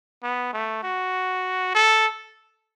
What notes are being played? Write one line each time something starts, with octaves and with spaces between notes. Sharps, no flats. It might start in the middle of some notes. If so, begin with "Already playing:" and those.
B3
A3
F#4
A4